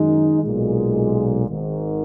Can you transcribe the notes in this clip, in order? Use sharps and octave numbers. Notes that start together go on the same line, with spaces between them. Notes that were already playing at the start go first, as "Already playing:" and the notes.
Already playing: F#2 D#3 G#3 D#4
B1 A#2 G#3
G#1 G#2 D#3